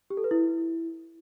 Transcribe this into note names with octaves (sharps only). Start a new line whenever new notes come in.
G4
A4
B4
E4